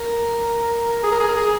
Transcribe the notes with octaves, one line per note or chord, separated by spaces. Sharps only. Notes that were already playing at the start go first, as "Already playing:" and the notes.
Already playing: A#4
G#4
A#4
G#4
A#4
G#4